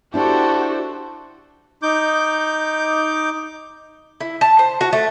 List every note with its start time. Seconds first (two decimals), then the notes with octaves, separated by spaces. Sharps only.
0.14 D4 E4 F#4 G4 A4 C5
1.82 D#4 D6 G6
4.21 E4
4.41 A5
4.59 C5
4.81 F#4
4.93 A3